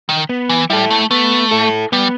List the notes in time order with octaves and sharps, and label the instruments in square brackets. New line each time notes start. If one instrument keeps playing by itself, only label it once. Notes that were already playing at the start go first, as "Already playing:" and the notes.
[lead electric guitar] D#3
[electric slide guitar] B3
[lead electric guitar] E3
[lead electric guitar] G3 [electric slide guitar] E4 A4
[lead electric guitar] A3
[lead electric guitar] A3 [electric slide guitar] B3
[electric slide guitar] E4 A4
[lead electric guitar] G3 [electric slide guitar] B3